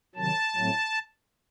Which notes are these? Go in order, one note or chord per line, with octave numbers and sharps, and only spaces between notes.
C3 D#3 F#3 A5
A2 F#3 A3 C4